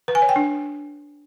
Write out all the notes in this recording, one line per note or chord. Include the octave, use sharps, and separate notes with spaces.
B4
G#5
C#5
G5
D4